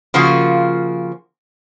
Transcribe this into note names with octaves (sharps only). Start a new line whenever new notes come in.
C#3 F3 A#3 F4 F#4